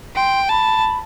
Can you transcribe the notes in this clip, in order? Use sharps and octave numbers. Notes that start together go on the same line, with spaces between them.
G5 C6
A5 B5